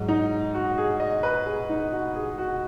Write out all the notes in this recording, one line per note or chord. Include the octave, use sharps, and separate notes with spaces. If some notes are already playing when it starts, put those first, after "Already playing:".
Already playing: G#2 F#3
D#4
F#4
G#4
D#5
B4
G#4
D#4
F#4
G#4
F#4